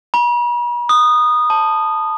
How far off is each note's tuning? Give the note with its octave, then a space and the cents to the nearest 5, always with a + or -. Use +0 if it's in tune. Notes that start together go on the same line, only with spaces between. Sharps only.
B5 -45
D#6 -15
A5 +5